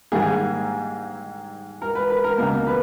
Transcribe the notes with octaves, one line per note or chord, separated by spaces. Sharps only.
G#2 D#3 G3 A#3 G#4
A#4
B4
B4
A#4
C#2 B2 A#3 A#4
B4